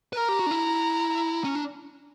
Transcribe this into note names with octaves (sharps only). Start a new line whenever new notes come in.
B4
A#4 A#5
G4
F#4
D4
E4
C#4
D4